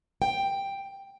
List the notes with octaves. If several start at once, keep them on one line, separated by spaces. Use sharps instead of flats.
G5